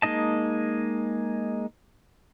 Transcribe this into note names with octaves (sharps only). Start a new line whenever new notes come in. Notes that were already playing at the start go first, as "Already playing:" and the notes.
G#3 A#3 D#4 D#5 A5